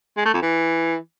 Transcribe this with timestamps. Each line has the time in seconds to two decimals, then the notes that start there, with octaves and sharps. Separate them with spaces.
0.17 G#3
0.25 A3
0.34 F2
0.42 E3